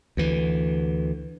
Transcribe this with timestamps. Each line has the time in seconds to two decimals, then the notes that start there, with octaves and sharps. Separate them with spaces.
0.17 D2 E3